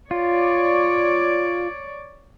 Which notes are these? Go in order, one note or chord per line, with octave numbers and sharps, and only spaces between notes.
F4 C#5 D5